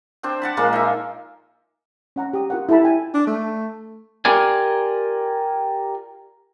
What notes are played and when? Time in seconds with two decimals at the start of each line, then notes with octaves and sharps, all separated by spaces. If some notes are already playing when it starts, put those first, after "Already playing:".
0.23 C4 D4 C5 G5
0.42 F#5 A5 B5
0.57 A#2 F3 G#3 A#3
0.73 D#4 E5
2.16 C#4 F#5 A#5
2.33 G4 D#6
2.50 F4 A#4 F#5
2.69 E4 G4 A4 A5 B5
2.83 G5 G#5
3.14 D4
3.27 A3
4.25 F4 G4 A#4 D5 G#5